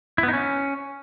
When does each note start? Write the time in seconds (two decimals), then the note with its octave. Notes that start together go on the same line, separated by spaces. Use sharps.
0.18 E4
0.23 B3
0.28 D#4
0.33 C#4